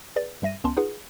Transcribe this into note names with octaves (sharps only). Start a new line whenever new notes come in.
G#4 B4 D5 A6
G2 G3 E5 A#6 D#7
C#2 B3 C#4 A5 C6
D#4 F4 G#4 B4 F#5